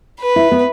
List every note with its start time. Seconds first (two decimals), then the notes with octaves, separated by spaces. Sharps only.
0.20 B4
0.36 E4
0.51 B3